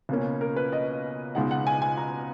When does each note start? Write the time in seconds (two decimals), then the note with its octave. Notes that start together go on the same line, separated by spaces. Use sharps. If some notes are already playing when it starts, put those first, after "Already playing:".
0.09 C#2 B2 A#3 C#4
0.41 A#4
0.56 B4
0.72 D#5
1.35 C#2 B2 G#3 D#4 F#5
1.51 F#5
1.67 G#5
1.82 G#5
1.97 A#5